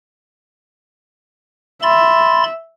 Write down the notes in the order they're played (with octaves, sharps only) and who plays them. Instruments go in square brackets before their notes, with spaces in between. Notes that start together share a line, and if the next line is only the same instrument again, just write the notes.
[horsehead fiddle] E5 [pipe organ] B5 C6 A6